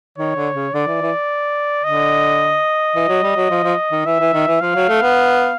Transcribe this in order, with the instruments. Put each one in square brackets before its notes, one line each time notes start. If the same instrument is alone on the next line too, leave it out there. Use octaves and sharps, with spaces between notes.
[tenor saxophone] D#3 [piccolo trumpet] C#5
[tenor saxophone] D3
C#3
[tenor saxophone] D3 [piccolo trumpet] D5
[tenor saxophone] E3
E3
[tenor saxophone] D3 [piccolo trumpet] D#5
[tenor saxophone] E3
F#3
G3
F#3
F3
F3
D#3
[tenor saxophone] E3 [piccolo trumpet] E5
[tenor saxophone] E3
D#3
E3
[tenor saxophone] F3 [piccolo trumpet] F5
[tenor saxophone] F#3
A3
B3